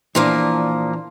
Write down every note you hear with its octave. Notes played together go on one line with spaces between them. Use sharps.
A#2 E3 F3 A#3 D4